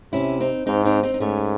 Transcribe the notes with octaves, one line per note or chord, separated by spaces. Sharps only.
C3 C#4 E4
C4 D#4
G#2 C4 D#4
C4 D#4
C4 D#4
D#4
G#2 A3 C#4